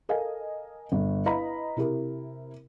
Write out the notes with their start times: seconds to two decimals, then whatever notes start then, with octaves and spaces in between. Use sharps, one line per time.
0.09 A4 A#4 D#5 F5 G#5
0.92 G1
1.26 E4 B4 D#5 F5 A#5 B5
1.76 C3 E4 G4 A#4